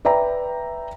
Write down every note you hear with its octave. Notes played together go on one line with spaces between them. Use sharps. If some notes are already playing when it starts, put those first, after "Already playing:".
B4 D5 E5 G5 A#5